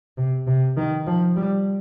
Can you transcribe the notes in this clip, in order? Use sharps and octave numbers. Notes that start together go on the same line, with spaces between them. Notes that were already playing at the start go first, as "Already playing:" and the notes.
C3
C3
D#3
F3
G3